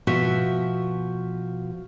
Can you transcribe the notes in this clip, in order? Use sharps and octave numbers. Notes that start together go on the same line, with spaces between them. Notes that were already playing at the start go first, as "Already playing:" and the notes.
B2 F3 F#4 E5